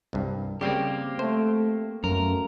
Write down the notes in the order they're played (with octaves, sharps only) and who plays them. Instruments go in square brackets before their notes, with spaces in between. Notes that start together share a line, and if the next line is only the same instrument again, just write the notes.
[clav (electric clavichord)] C2 G2
[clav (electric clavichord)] C#3 G3 [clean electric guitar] A#3 C4 G4
[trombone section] A3 [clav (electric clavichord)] C5
[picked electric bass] F#2 [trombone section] B2 A3 A#3 [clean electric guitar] A#4